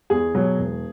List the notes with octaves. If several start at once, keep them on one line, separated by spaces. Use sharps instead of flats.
E2 G#4
B2 F#3
E1